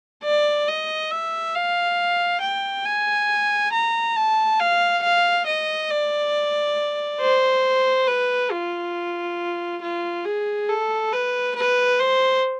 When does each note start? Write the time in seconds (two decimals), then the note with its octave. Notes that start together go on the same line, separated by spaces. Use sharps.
0.24 D5
0.68 D#5
1.11 E5
1.54 F5
2.41 G5
2.85 G#5
3.73 A#5
4.16 A5
4.60 F5
5.03 F5
5.46 D#5
5.90 D5
7.21 C5
8.07 B4
8.51 F4
9.82 F4
10.25 G#4
10.69 A4
11.12 B4
11.56 B4
11.99 C5